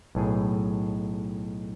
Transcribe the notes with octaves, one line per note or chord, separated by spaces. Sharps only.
B1 A2 G#4